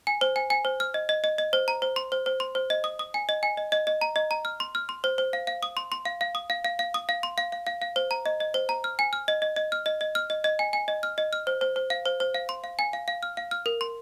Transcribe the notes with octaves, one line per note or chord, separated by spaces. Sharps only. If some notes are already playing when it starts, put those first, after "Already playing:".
G#5
C5
G#5
G#5
C5
F6
D#5
D#5
D#5
D#5
C5
A#5
C5
C6
C5
C5
C6
C5
D#5
D#6
D#6
G#5
D#5
G#5
D#5
D#5
D#5
A#5
D#5
A#5
F6
C6
F6
C6
C5
C5
F5
F5
D#6
C6
C6
F5
F5
D#6
F5
F5
F5
D#6
F5
C6
F5
F5
F5
F5
C5
A#5
D#5
D#5
C5
A#5
F6
G#5
F6
D#5
D#5
D#5
F6
D#5
D#5
F6
D#5
D#5
G#5
G#5
D#5
F6
D#5
F6
C5
C5
C5
F5
C5
C5
F5
C6
F5
G#5
F5
F5
F6
F5
F6
A#4
C6